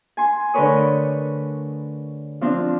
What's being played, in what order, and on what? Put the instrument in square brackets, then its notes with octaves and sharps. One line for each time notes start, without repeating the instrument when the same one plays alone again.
[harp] G#5 C6
D3 A3 A#4 B4 C#5 D#6
F3 C4 D4